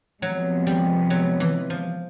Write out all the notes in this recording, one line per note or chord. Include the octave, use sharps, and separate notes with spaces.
C3 F3 F#3 G#3 B3
G3
F#3
E3
F3